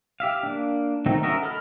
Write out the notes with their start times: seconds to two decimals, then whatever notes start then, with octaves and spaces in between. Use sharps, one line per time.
0.20 G4 E5 F5
0.43 A#3 D4
1.06 D#3 F#3 A3 C4 D#4
1.23 C#4 F#4 A#4 D#5 E5
1.43 A4 D#5 B5 F6